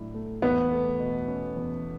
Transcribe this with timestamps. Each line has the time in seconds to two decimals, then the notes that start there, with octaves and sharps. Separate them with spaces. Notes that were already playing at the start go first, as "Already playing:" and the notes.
Already playing: A2 F#3 D4
0.14 A3
0.42 E2 B3
0.71 A3
1.00 B2
1.28 C#4
1.56 E2